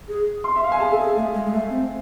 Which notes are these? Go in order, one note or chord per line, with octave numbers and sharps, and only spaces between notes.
G#4
C6
E5
F5
G#5
G#4 A5
A4
G#4
A3
G#3
G#3
A3
C4